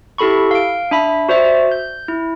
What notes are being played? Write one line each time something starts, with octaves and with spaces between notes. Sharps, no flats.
E4 G4 A4 B5 C#6
F5 D7
D4 E5 B5 B6
F#4 C5 D5 E5
G6
E4